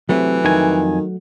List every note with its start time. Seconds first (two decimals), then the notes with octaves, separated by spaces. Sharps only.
0.09 C3 E3 F#3 A3
0.45 F2 D#3 G#5